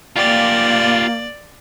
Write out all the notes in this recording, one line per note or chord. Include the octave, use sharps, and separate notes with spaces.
A#3 F4 G4 D5